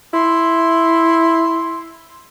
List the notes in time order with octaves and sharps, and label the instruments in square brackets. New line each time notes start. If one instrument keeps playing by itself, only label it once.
[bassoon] E4 [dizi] C6